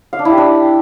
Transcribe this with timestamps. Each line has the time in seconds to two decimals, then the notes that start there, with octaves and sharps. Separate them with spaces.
0.13 F5
0.19 D4
0.25 E4
0.31 G4
0.38 D4